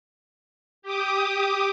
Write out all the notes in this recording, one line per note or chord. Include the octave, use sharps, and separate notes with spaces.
G4 D6 D#6